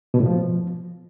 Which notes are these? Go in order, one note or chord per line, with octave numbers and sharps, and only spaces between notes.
B2
A2
F3